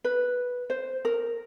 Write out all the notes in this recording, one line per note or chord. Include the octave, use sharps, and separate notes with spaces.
B4
C5
A#4